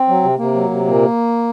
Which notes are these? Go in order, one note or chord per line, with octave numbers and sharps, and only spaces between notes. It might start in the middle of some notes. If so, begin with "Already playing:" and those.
Already playing: C4
F#3
C3
C3 A#3
F#3
C3
A#2 A#3